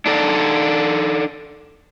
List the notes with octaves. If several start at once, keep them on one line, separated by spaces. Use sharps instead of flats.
D4 D#4 A4 D5